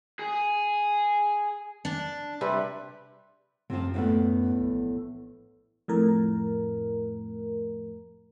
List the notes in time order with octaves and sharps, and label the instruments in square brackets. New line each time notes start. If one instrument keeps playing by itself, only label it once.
[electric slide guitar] G#4
[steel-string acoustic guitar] D4
[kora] C3 G3 B4
[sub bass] F#2 [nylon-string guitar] C3 F3
[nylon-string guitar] E2 A2 B3
[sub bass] A#1
[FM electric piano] F2 A2 A#4